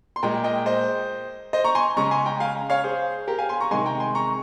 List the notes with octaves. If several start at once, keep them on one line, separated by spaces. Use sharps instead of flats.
C6
A#2 G#3 G5 A#5
D#5 G5
C5 D#5
C5 D#5
A#5 C#6
G#5 C6
C#3 G#3 A#5 C#6
G#5 C6
G5 A#5
F5 G#5
C#5 F5
G#4 C5
G4 A#4
F5 G#5
G#5 C6
A#5 C#6
C3 D#3 G#3 G#5 C6
G5 A#5
G#5 C6
A#5 C#6